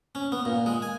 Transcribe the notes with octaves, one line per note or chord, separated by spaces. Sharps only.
C#4
B3
A#2
G#3
G#5